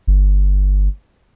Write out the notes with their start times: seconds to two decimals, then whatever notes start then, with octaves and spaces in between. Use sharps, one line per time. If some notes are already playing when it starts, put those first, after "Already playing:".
0.07 G1